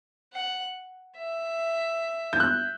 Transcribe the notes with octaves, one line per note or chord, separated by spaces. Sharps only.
F#5
E5
G6
F#6